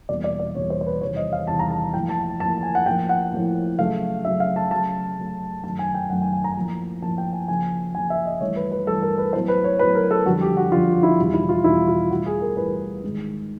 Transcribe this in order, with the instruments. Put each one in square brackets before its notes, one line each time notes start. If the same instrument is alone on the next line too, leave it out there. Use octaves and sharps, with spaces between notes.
[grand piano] E2 B2 G3 A#3 D5
D5
D5
E2 B2 G3 A#3 C#5
C5
C5
B4
E2 C3 D#3 G3 C#5
D#5
F5
E2 C3 D#3 G3 A5
A#5
A5
A2 F3 A#3 G5
A5
A2 F3 A#3 A5
G#5
F#5
A2 F3 A#3 G5
F#5
A2 F3 A#3
C#3 F#3 A3 F5
C#3 F#3 A3 E5
F5
A5
C#3 F#3 A3 A5
C#3 F#3 A3
F#2 D#3 F#3 A3 A5
G#5
G5
F#2 D#3 F#3 A3 F#5
G#5
G#5
A#5
A2 F3 A#3
A2 F3 A#3 A5
G5
G#5
C#3 F3 A#3 G#5
C#3 F3 A#3 G#5
E5
D#5
G2 E3 A3 C#5
B4
B4
G2 E3 A3 A4
A#4
B4
A2 F#3 B3 C5
B4
C#5
A2 F#3 B3 B4
A#4
A4
F2 D3 G3 F#4
G4
F#4
F2 D3 G3 F4
E4
E2 B2 G3
E4
F4
E2 B2 G3 E4
F4
A2 E3 G3 F#4
G#4
A#4
A2 E3 G3 B4
G#2 D#3 G#3